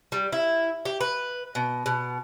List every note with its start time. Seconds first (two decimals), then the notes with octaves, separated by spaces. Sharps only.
0.12 G3
0.32 E4
0.85 G4
1.01 B4
1.55 B2
1.86 B2